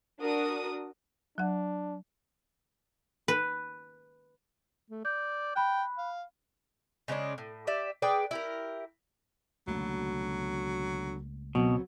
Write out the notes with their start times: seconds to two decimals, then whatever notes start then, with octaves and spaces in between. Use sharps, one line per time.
0.19 D4 F#4 A#4 D#6
1.38 F#3 D4 F#5
3.28 B4
4.90 A3
5.05 D5 G6
5.56 G5 B5 F#6
5.98 F5
7.08 C#3 G#3 C#4 D4
7.38 A2
7.67 G4 D5 E5
8.02 G#4 B4 D5 G5
8.31 E4 G4 A#4
9.67 C#2 B2 D3 F#3 A3 A#3
11.55 B2 F#3 B3 C4